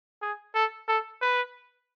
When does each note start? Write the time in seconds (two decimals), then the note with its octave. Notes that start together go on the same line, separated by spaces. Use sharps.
0.22 G#4
0.54 A4
0.88 A4
1.21 B4